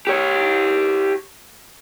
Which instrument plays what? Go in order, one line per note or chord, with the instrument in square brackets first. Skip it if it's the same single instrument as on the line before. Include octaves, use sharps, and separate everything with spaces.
[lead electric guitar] G4 C#5